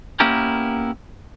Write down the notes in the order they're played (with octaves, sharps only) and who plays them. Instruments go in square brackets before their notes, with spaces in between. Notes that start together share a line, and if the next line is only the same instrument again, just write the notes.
[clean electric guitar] A#3 B3 C#4 E4 G4 A#4